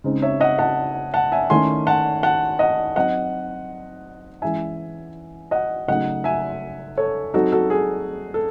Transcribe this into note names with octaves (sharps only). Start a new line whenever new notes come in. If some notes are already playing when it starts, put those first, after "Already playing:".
C#3 G#3 C4 D#4
C#5 E5
D#5 F#5
F#5 A5
F#5 A5
E5 G#5
D#3 A3 C#4 E4 G#5 C6
F#5 A5
F#5 A5
D#5 F#5
F#3 C4 D#4 D#5 F#5
E3 G#3 C#4 E4 E5 G#5
D#5 F#5
C#3 F#3 A3 D#4 D#5 F#5
E5 G#5
A4 C#5
F#3 C4 D#4 F#4 A4
F#4 A4
G#4
A4